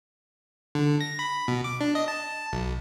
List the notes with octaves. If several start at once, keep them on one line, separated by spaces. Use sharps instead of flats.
D3
A#6
B5
B2
D6
D4
D#5
A5
B1